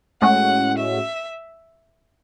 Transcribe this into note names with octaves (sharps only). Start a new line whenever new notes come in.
A2 G#3 C#4 F#4 F#5
E5